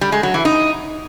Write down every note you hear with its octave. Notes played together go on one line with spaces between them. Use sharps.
G3
G#3
F#3
E3
D#4